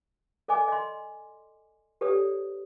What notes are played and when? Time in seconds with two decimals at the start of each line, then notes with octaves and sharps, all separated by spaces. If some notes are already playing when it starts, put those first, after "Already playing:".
0.48 A4 D5 D#5 G#5 D6
0.68 D#5 C6
2.01 G4 A4 B4 C#5 D5 D#6